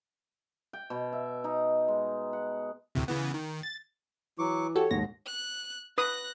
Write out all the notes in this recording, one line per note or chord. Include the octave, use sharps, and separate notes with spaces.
G5
B2
E5
D#4
G#3
F#5
D2 A2 C3
C#3 E3 B3
D#3
A6
E3 F#3 C#6 D6
F#4 G4 A4 C#5
A#1 D#2 G#2 A#6
F#6
B4 D#6 F#6 A#6